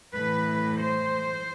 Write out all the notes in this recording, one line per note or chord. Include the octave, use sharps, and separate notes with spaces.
A2 E3 B4
C5